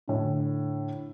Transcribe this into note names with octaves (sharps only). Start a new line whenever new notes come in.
A2 D3